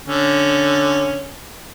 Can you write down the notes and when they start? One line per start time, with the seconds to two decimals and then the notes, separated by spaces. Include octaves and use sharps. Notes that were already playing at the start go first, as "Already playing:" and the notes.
0.06 D3 C#4